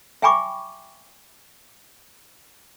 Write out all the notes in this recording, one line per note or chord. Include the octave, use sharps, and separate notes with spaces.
E5 G5 G#5 B5 C#6 D6